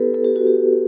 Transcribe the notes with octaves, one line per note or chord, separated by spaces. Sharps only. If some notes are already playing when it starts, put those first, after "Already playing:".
Already playing: B3 E4 G4 A4 B4
A4
G4
F#4
G4